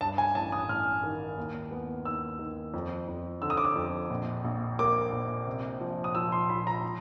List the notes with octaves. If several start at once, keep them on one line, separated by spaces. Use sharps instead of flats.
G2 A5
G#5
A1 A5
D#6
A1 F6
D#3
D#2
B3
D#2 E6
D#3
F2
F2
D3 E6
D#6
D6
D#6
F2
A#1
A#1
A#3 D6
A#1
C3
F3
D#6
F3 E6
C6
F3 B5
A#5
F3